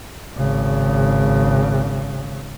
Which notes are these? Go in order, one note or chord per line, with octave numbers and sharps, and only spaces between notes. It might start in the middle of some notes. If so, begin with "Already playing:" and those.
G#1 C#3